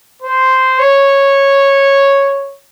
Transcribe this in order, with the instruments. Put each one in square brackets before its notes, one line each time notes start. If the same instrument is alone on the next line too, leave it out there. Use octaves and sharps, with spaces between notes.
[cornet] C5
C#5